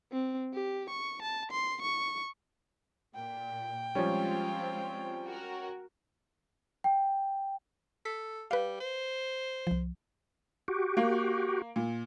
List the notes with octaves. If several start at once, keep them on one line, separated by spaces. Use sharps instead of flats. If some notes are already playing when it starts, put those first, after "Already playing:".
C4
G4
C#6
A5
C6
C#6
A#2 G5
F3 G3 G#3 C4 C#4 F4
F#4 A#4
G5
A4 B6
G3 B4 F5
C5
C2 F3
F#4 G4
A#3
A#2